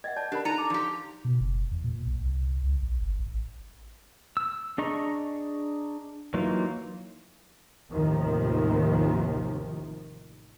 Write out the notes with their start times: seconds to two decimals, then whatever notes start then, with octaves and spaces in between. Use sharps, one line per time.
0.04 D#5 E5 F#5 G#6
0.16 D5 A5 G6
0.32 D4 G4 A#4 B5
0.45 D#4 A4 A5 A#5 C#7 D#7
0.58 D6
0.70 F3 G4
1.25 B2
1.40 F#1
1.71 E2
1.84 A#2
2.06 B1
2.20 C2
2.63 C#2
2.82 A#1
3.01 G1
3.19 A1
4.37 E6
4.78 D4 G#4 D#5 A#5 C#6
6.34 E3 F#3 A#3 D#4 F4
7.91 A1 D#2 C3 D#3 F3